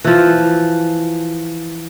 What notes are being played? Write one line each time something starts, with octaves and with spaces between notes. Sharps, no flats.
E3 F3